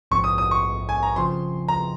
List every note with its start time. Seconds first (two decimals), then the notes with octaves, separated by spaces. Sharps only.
0.11 A#1 G#2 F3 C4 C#6
0.24 D#6
0.38 D#6
0.51 C#6
0.89 G#5
1.03 A#5
1.16 C#3 F3 C4 C6
1.68 A#5